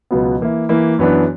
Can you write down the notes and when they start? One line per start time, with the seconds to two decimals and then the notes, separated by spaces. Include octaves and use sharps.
0.11 C#2 B2 F#3 B3
0.40 E3 A#3 E4
0.69 E3 A#3 E4
0.99 F#2 E3 B3 D4